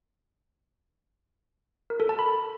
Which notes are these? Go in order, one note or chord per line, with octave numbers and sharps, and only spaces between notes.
A#4
A4
A5
B5